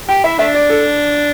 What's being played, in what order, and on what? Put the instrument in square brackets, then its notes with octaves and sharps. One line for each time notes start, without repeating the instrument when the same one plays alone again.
[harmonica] G4 [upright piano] G5
[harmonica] E4 [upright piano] E5
[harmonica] A3 D4 [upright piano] E5
[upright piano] D5
A4